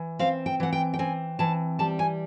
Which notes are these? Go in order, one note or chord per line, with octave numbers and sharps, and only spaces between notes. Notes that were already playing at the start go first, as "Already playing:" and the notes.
Already playing: E3
C4 F5
G5
E3 F#5
G5
G5
C4 G#5
E3 A5
G3 A5
G#5